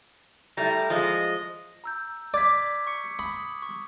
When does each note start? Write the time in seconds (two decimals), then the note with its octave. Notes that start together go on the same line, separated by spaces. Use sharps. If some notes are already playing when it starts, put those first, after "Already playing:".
0.57 G3 A3 E4 A#5
0.90 F3 G#3 D#5
1.84 A#5 E6 G6
2.34 D5 D6 G#6 B6
2.87 C#6 C#7
3.19 B5 D#6
3.62 C#6